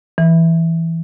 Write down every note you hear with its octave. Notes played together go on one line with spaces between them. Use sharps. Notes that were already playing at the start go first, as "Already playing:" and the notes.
E3